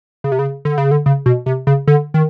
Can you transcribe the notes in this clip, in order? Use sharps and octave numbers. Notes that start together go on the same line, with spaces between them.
C#3
C3
C#3
D3
C#3
D3
C#3
B2
C3
C#3
D3
D#3